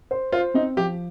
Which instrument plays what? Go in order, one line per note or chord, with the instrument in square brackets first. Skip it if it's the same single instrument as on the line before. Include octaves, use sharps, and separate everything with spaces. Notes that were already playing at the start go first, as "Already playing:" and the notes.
[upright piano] C5
[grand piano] F4 [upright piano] C5
[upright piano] C4 [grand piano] D#4
[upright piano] F3 [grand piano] G4